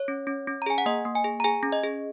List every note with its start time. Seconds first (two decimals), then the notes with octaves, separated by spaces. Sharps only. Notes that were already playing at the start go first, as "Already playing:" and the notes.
Already playing: C#5
0.08 C#4
0.27 C#4
0.47 C#4
0.62 A#5
0.66 G#4 G#5
0.78 F#5
0.86 A#3 D#5
1.05 A#3
1.15 G#5
1.24 G#4
1.40 A#5
1.44 G#4 G#5
1.63 C#4
1.72 D#5
1.83 G#4